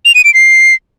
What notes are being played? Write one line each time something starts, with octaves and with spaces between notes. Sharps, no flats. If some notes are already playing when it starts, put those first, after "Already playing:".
F7
D#7
D7
C7